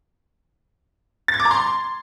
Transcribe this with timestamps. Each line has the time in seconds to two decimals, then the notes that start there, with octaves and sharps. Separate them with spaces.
1.28 A6
1.34 G#6
1.40 D6
1.45 A#5
1.51 C6